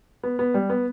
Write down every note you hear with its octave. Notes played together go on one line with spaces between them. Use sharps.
B3
B3
G3
B3